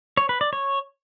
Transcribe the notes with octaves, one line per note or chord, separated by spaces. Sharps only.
C#5
B4
D5
C#5